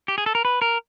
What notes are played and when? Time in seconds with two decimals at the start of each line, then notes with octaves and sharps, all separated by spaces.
0.08 G4
0.18 G#4
0.26 A4
0.35 A#4
0.45 B4
0.62 A#4